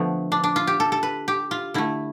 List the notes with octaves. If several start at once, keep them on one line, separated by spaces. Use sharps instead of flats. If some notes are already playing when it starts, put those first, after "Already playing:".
Already playing: D3 F3 A3 B3
D4
D4
F4
G4
A4
A4
B4
G4
F4
D3 A3 E4